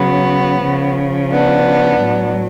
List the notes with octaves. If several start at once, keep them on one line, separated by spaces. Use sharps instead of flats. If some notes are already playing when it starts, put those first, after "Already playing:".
Already playing: C#3 F#3 B3
C#3 F3
B3 D4
A2 F#3